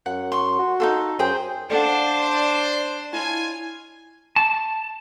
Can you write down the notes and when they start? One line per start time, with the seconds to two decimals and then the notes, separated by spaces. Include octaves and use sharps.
0.06 F#2 F#5
0.32 C6 C#6
0.59 F#4
0.80 D#4 F4 A4
1.19 F#2 G#4 C5 G5
1.70 D4 A4 C5 D5 F5 F#5
3.13 E4 F4 C#5 D#5 G#5 A5
4.36 A5